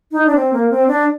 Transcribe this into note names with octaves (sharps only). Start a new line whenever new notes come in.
D#4
D4
C4
A#3
C4
D4